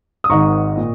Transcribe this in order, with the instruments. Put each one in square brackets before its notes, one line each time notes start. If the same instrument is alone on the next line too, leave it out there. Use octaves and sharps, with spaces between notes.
[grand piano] D#6
G#1 G#2 D#3 A#5 C#6
A#2